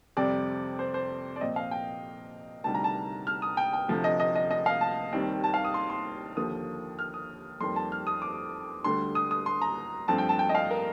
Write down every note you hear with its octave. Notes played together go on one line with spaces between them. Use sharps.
F2 C3 G3 C4 D5
C5
C5
D5
A#2 F3 C4 D#5
F5
G5
D2 C3 D#3 G3 A5
A#5
A5
F6
D#6
G5
G5
D2 C3 F3 A3
D#5
D#5
D#5
D#5
F5
A5
D#2 D#3 G3 C4
A5
F5
D#6
C6
C6
D#2 D3 F3 A#3 D#6
F6
D#6
F2 D#3 G3 A#3 C6
A5
F6
D#6
D6
D2 D3 G3 C6
D#6
D#6
C6
A#5
G2 F3 A3 C4 A5
G5
A5
G5
D#5
F5
A#4